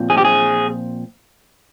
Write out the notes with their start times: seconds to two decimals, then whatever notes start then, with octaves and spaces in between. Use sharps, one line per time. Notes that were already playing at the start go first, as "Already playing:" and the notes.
Already playing: A#2 F3 C4
0.10 G#4
0.18 G4
0.25 G#4